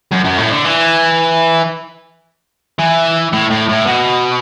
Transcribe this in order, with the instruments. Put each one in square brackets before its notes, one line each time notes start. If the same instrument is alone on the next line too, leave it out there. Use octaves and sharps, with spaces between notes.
[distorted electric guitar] F#2
F#2
A2
D3
E3
E3
A2
A2
A2
B2